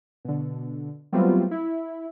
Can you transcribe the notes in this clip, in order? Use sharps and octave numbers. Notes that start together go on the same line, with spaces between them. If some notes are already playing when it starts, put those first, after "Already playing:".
B2 D3
F#3 G3 A3 B3 C4 F4
E4